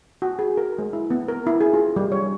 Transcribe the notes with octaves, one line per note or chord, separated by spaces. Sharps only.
F#4
G#4
A#4
G#3
E4
B3
A#4
E4
G#4
F4
G3
C#5